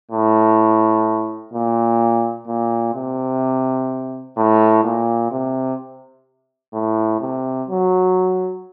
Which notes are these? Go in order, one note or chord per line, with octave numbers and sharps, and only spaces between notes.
A2
A#2
A#2
C3
A2
A#2
C3
A2
C3
F#3